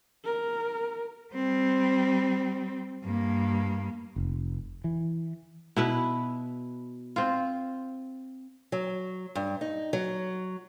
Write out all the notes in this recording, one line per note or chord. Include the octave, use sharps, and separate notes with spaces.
A#4
G3 C4
G2 A#3
F1
E3
B2 E4 B4
C4 F4
F#3
G2
D#4
F#3